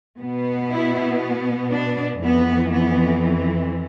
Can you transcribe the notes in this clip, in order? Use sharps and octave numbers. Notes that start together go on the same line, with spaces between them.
B2 B3
E4
D4
F2 E3 B3
B3